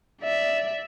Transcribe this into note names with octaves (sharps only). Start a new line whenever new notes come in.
D5 E5